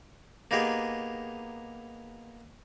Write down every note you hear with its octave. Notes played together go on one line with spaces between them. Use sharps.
A#3 B3 D#4 G4 G#4